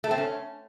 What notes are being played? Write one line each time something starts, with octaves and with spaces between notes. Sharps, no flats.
A3
C4
C#4